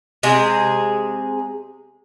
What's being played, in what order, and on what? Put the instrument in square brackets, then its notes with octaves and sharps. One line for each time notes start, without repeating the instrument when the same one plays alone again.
[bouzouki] C3 G#3 G#4